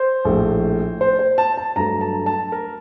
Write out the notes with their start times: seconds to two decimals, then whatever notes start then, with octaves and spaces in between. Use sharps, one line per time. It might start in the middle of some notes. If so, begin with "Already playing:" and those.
Already playing: C5
0.25 A#1 A2 A3
1.01 C5
1.19 C5
1.38 A5
1.57 A5
1.76 G2 F#3 A3 A#5
2.01 A5
2.26 A5
2.52 A#4